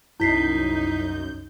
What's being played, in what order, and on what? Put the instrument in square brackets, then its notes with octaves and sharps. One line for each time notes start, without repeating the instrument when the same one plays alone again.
[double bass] C2 D#4 [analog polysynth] F#2 G6 [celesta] E4 B6 C7